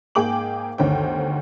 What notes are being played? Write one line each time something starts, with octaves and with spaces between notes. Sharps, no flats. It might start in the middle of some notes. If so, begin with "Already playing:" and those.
G#2 A#3 G#4 G5 D6 F#7
G1 D2 D#3 C5 C#5 G5